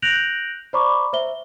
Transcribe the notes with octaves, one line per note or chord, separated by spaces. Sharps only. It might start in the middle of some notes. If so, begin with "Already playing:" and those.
F#6 G6 A#6 D7 F7 F#7
C5 D5 A#5 B5 C#6 D6
C5 E5 G7